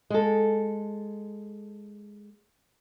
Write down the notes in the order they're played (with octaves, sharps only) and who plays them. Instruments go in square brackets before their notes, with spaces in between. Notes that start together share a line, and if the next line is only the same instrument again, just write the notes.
[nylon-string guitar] G#3 A4